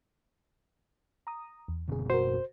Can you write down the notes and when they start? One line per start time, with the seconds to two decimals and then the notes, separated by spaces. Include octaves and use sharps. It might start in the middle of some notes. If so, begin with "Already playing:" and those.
1.27 A#5 D#6
1.68 E2
1.88 F#1 B2 D3 C4 G#4
2.10 F#4 A#4 C5